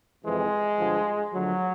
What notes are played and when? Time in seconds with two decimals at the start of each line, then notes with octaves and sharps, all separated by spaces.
0.25 F2 C3 E3 G#3
0.78 G2 D3 F3
1.32 D2 D3 F3 F#3